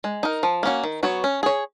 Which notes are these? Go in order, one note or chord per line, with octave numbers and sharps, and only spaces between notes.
G#3
D#4 A#4
F3
A#3 C#4 F#4
D#3
F#3 B3 F#4 C#5
C#4
G#4 C#5